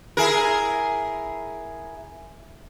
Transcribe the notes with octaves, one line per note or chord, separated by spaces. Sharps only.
E4 G#4 A#4